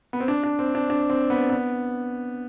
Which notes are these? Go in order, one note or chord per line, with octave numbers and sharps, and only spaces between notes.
B3
C4
D4
D4
C4
D4
D4
C4
B3
B3